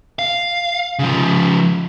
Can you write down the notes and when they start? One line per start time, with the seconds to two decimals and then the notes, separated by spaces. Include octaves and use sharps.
0.19 F5
0.99 C#3 F3